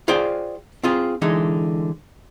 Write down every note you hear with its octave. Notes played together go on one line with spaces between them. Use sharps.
F4 G#4 C5 D5 G5
C4 F4 G#4
D3 E3 G#3 D#4